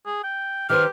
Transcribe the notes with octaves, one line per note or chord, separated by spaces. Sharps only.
G#4
G5
D#3 G4 B4 C5 F6